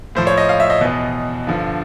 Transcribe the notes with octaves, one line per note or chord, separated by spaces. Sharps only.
A2 F3 C5
C#5
D#5
F5
E5
D#5
E2 B2 D#5
G2 D3 F3